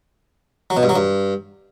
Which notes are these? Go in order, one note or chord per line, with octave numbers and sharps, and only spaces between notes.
F#3
B2
G2
F#3
G2